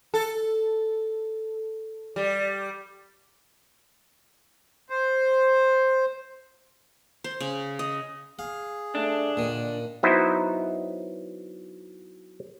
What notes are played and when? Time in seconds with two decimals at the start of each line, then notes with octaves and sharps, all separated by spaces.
0.14 A4
2.16 G3
4.90 C5
7.24 C5
7.40 C#3
7.79 D#5
8.39 G#4 F5
8.95 A3 D4
9.37 A#2 D3 D#3
10.03 F#3 B3 D#4 E4 C5 D#5